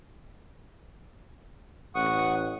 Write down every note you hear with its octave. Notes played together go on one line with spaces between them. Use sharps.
A1 F#5 C#6 D#6